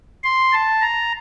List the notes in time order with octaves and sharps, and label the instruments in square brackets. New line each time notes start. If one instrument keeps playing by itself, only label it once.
[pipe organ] C6
A5
A#5